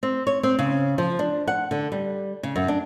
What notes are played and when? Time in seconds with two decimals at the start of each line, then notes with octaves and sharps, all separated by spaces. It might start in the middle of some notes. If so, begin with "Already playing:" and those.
0.03 C4
0.27 C#5
0.43 C4
0.59 C#3
0.98 F3
1.19 D4
1.47 F#5
1.71 D3
1.92 G3
2.43 C#3
2.56 F#2
2.68 D4